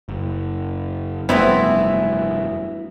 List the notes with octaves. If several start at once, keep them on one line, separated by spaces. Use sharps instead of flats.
F#1
F1 G2 E3 F#3 A3 B3 C4 E4